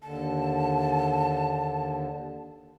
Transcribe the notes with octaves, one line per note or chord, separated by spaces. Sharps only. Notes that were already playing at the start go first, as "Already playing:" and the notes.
D#2 D3 A5